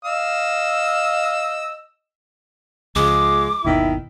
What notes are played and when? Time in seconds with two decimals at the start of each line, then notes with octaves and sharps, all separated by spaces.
0.05 D#5 F5 E6
2.96 C#2 F3 G#3 D6
3.64 G1 D#2 B2 D#3 E4